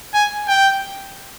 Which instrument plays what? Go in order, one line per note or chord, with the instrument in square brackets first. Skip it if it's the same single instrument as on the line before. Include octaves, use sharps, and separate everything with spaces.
[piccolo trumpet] G#5
G5